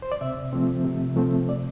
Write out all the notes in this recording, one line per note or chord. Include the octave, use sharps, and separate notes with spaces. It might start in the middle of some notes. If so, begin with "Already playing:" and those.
C5
D5
C3 E5
F3 A3 C4
C3
F3 A3 C4
D5